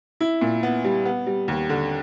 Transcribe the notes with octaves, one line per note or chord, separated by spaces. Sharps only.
E4
A#2
B3
G3
B3
G3
D#2
D3